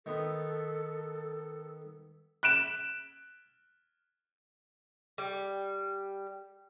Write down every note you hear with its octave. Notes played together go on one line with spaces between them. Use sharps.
D#3 B3 A4 B4
F#6 D7 E7
G3